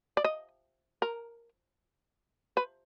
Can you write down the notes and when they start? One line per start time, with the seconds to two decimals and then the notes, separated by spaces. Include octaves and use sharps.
0.17 D5
0.24 D#5
1.02 A#4
2.57 B4